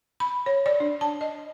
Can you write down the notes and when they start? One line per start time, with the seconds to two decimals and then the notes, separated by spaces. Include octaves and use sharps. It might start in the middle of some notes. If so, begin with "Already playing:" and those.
0.20 B5
0.46 C#5
0.66 D5
0.80 D4
1.01 A5
1.21 D#5